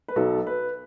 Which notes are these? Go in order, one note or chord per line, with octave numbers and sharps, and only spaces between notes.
B4
B1 B2 F#3 A4
B4